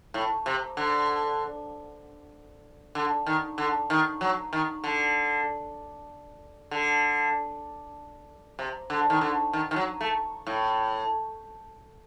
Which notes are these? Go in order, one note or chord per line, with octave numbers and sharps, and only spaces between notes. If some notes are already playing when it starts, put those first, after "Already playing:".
A2
C3
D3
D3
D#3
D3
D#3
F#3
D#3
D3
D3
C3
D3
D#3
D3
D#3
D#3
F#3
A3
A2